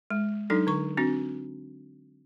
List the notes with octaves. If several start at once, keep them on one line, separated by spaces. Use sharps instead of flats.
G#3
F#3 D4 D#4 A4
D3 C#6
C4 D4 F#4